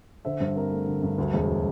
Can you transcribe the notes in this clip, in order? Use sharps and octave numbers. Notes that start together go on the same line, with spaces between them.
D3 C5 E5
G2 C5
C4 A#4
A3
D3
G2
D2
E1